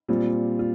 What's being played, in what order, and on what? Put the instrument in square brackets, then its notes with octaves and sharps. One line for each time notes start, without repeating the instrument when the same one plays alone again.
[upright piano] A#2 G3 C4 F4
F4